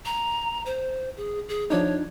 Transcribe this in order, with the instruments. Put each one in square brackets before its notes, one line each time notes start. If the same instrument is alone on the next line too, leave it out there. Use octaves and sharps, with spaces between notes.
[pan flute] A#5
C5
G#4
G#4
[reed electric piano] F3 D4 D#4 [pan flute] C#5